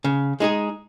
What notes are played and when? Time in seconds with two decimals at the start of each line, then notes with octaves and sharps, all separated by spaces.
0.04 C#3
0.40 G#3 D#4 G#4